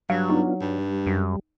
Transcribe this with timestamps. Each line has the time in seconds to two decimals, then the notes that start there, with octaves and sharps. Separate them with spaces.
0.10 G2 F#3 F5
0.30 B3 D4 D#4 F4
0.61 G2 G3
1.06 F#2